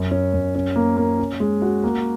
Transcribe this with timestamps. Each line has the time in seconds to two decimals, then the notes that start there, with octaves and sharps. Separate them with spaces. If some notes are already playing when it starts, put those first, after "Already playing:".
Already playing: F#2
0.11 C#4
0.34 F#2
0.55 C#4
0.76 A#3
0.97 A#3
1.19 C#4
1.40 G#3
1.62 F#4
1.84 A#3